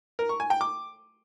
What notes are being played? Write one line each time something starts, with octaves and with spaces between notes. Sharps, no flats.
A#4
C#6
G#5
G5
D6